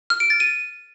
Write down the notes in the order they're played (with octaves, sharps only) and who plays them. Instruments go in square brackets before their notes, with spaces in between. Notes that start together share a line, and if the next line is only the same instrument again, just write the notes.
[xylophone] F6
D7
A6
D#7